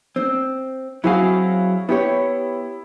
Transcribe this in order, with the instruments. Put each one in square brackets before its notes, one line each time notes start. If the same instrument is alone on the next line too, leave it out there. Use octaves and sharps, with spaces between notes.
[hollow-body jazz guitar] C4
[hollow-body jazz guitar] F#3 C4 G#4 [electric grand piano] E4 F#4 F5
[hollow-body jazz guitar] B3 G4 C#5 [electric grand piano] E4